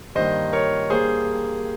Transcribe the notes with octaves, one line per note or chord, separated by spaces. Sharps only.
G2 D#3 A#3 C5 D#5
A#4 C#5
G2 G3 A#3 G#4 C5